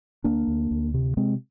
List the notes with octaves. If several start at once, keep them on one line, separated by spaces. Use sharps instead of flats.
D2 A#3 D4
D2
D2
C3
C3 G#3 C4